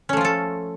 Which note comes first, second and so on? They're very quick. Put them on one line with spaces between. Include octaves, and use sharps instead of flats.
C#4 A3 F3 F4 A4